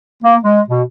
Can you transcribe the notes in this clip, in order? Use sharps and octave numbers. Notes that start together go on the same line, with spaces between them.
A#3
G#3
B2